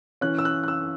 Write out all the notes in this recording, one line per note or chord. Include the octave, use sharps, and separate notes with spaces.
E3 C#4 F#6
E6
F#6
F#6
E6